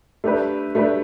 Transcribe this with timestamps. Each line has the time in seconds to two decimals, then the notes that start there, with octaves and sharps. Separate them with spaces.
0.24 A3 D4 G4 B4
0.75 A3 D4 G4 B4